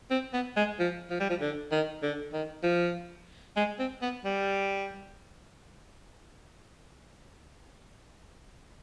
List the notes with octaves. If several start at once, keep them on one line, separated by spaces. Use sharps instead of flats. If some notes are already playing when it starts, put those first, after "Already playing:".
C4
B3
G#3
F3
F3
G3
F3
D3
D#3
D3
D#3
F3
G#3
C4
B3
G3